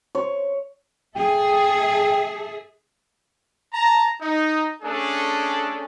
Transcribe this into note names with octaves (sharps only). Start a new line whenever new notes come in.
C#5
G#4 A4 E5 G5
A5 A#5
D#4
A3 C#4 D4 G#4 A4